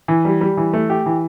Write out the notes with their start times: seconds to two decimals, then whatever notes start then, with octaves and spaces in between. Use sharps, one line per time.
0.08 E3
0.25 G3
0.41 G3
0.57 E3
0.73 A3
0.90 G4
1.06 E3